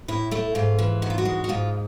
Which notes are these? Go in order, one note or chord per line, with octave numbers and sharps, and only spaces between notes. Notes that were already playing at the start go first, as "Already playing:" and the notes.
A2 E4
A3 E4
G#2 F4
E3
G#2 F#4
F4
F#4
G#3
F#4
G#2 F4